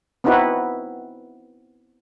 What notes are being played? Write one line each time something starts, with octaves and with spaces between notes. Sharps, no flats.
B3 C4 D#4 E4 F#4 B4